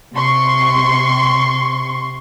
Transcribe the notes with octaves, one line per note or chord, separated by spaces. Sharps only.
C3 C6 C#6